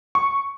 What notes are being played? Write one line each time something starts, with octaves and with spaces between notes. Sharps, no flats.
C#6